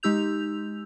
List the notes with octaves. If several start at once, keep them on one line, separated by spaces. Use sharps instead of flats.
G#3 D#4 G4 E6 G6 F7